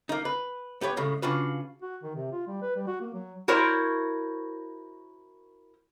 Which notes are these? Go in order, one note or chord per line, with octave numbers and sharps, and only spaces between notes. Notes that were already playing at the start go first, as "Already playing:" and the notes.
A#3 D#4
B4
B3 G4 B4 C#5
A2 C#3 G#3
C#3 D4 F4 F#4 B4
F#4
D#3
C3
F4
G3
B4
G3
F#4
A#3
F#3
E4 F#4 A#4 C5 C#5